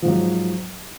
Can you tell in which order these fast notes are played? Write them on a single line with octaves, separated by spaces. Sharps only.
F3 G#2 F#3